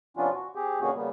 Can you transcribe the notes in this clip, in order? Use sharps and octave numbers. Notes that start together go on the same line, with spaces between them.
C3 F3 B3 C#4 D4 F4
F#4
C4 G4 G#4
B2 D3 A#3 C#4 F#4 G#4
C#3 G3 A#3 B3